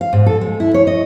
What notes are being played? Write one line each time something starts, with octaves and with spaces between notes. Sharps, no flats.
F5
G#2
A4
G#3
E4
C#5
D#5